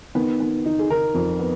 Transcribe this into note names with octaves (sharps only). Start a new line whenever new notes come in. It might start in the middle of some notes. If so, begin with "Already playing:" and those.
D#3 B3
D#3 B3
D#3 D#4
G#4
D#3 A#4
F2
B3